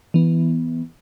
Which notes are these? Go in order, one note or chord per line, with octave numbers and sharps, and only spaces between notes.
E3 B3